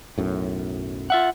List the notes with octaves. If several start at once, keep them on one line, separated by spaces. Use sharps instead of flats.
B1 F#2 A2
F4 E5 F#5